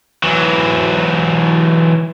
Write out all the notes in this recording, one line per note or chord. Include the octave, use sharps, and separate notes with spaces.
E3 F#3